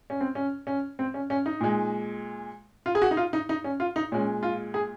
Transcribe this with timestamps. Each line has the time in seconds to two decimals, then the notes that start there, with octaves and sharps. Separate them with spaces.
0.10 C#4
0.21 C4
0.35 C#4
0.67 C#4
0.99 C4
1.14 C#4
1.30 C#4
1.46 D#4
1.61 A#2 G#3
2.86 F4
2.95 G#4
3.02 F#4
3.11 D#4
3.17 F4
3.33 D#4
3.49 D#4
3.64 C#4
3.80 F4
3.96 D#4
4.12 A#2 G#3 C#4
4.43 F4
4.74 G#4